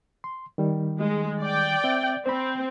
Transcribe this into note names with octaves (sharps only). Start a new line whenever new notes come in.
C6
D#3 G3
G#3
D5 G5
C4 E5
C4 C5 B5